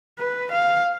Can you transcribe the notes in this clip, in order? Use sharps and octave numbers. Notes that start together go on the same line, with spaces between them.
B4
F5